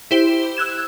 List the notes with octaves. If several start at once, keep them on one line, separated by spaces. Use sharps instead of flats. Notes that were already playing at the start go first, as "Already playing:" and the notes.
E4 G4 C5
E6 F#6 G#6 E7